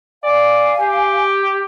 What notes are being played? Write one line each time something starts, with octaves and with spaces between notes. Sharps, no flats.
D5 F5 G#5
G4